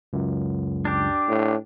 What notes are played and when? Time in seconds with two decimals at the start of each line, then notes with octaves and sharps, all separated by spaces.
0.13 C#2 F#2
0.85 D4 G4
1.28 A2